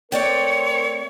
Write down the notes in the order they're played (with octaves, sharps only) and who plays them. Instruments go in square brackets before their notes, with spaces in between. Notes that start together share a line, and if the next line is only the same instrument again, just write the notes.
[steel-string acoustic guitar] A3 D5 G5 [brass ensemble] C4 A#4 [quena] C#5